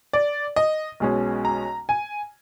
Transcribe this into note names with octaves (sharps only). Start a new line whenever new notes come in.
D5
D#5
B1 B2 G#3 C#4
A#5
G#5